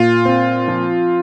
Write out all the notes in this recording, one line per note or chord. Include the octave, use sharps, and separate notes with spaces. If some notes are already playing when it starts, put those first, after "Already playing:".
Already playing: A#2 F4
C4
F3